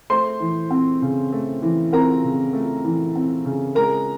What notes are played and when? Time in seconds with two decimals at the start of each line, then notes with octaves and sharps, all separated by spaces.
0.10 A3 C5 C6
0.40 E3
0.71 C4
1.02 C#3
1.33 A3
1.62 E3
1.92 C4 A#4 A#5
2.24 C#3
2.53 A3
2.85 E3
3.16 C4
3.45 C#3
3.75 G#3 A#4 A#5